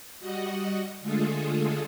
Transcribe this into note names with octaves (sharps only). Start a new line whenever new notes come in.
G3 F#4 D#5 F#5
D3 G#3 A3 F4 G#4 A4